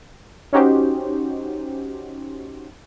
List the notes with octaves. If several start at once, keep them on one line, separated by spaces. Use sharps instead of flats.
C#4 D#4 F#4 G4 C5